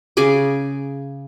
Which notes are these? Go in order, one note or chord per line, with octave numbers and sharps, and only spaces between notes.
C#3 G#4 G#5 D6